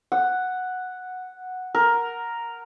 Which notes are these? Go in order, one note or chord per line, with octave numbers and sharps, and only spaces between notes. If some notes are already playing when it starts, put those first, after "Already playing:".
F#5
A#4